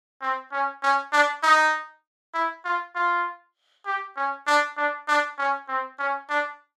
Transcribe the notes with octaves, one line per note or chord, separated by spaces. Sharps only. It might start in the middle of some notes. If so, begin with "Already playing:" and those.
C4
C#4
C#4
D4
D#4
E4
F4
F4
G4
C#4
D4
D4
D4
C#4
C4
C#4
D4